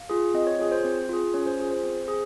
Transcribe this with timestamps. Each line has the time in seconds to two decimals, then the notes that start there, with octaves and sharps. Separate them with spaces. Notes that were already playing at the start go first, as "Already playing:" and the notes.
Already playing: F5
0.10 F4 G#4
0.34 C4 D#5
0.47 C#5
0.59 F4 G#4 C#5
0.72 C5
0.85 C4
1.09 F4 G#4
1.34 C#4 C#5
1.46 C5
1.59 F4 G#4
1.71 C5
1.83 C4
2.08 G#4